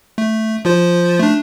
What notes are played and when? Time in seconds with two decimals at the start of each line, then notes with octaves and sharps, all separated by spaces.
0.18 A3
0.65 F3 F4 C5
1.19 A3 D4